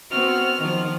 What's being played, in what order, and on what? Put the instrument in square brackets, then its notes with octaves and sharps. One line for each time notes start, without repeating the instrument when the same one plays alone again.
[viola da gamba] B3 C4 F#4 [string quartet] F6
[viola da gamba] D#3 F3